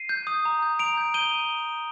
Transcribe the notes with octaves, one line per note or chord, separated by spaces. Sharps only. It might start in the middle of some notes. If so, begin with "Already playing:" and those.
Already playing: C7 D#7
G6
D#6
A#5
G6
A#5 D7 F7
G6
G6 D#7 G7